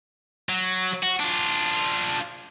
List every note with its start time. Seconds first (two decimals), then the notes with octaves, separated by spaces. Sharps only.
0.49 F#3
1.03 F#4
1.20 D4 F4